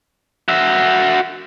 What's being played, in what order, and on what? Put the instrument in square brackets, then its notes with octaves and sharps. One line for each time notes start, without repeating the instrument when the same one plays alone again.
[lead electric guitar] F#4 E5